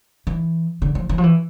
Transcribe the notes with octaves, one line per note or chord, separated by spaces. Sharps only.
E3
D3
F3
E3
F3
E3